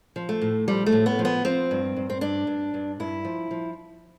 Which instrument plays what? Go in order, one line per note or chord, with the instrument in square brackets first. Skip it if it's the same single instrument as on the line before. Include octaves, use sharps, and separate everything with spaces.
[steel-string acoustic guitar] F3
A3
A2
F3 G3
A3
A2
B3
F3
B3
F3 C4
G2
G2
C4
G2 D4
G2
G2
G2 E4
F3
F3